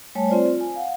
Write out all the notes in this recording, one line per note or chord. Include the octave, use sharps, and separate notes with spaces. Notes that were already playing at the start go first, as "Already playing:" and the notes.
G3 A3 C#5 G#5 A5
C4 F4 C5 D5
F4
G#5
F5 F#5